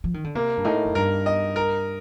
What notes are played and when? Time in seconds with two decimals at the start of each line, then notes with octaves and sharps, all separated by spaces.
0.04 F3
0.14 D#3
0.24 D3
0.35 C3 A#3
0.57 G2
0.65 A2 D#4
0.85 F2
0.95 G2 A#4
1.26 D#5
1.56 A#4